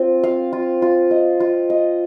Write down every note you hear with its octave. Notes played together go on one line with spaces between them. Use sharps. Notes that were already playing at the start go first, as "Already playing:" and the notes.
Already playing: C4 F4
F5
F4
F4
D#5
F4
D#5